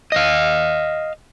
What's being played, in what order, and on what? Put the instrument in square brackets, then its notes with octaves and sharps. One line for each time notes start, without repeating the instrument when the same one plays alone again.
[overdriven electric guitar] D#5 F5